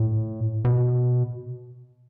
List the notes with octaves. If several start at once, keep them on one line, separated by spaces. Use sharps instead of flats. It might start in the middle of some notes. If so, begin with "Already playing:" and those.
Already playing: A2
B2